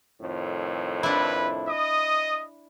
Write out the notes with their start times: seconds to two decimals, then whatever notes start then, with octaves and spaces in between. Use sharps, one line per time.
0.21 F2 A2 D#3
1.03 D4 E4 B4
1.69 D#5 D#6